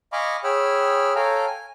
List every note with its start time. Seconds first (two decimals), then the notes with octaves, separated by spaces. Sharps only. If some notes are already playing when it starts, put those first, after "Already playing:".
0.13 D#5 F5 G#5 B5 C#6 D6
0.44 G#4 C#5 G5 B5 E6 F6
1.16 A4 C#5 F5 G5 G#5 A#5
1.47 G#5